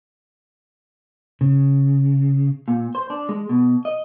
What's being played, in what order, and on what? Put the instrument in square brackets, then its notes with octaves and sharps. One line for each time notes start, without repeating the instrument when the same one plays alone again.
[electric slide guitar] C#3
A#2
C5
D4
G#3
B2
D#5